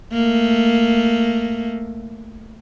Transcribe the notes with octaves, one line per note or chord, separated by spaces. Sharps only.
A3 A#3